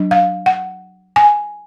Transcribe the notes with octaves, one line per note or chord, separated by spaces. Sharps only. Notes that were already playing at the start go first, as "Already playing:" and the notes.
Already playing: F#3 D4
F5
F#5
G#5